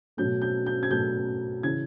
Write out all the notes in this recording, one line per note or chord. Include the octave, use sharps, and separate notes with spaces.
B2 F#3 A3 G6
G6
G6
G#6
B2 F#3 A3 G6
C#3 E3 G#6